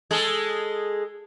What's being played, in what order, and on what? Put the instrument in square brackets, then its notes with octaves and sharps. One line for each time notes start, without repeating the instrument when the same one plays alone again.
[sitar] G#3 G#4 A4